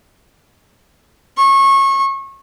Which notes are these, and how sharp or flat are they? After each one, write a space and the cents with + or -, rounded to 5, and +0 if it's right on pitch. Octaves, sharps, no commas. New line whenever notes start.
C#6 -25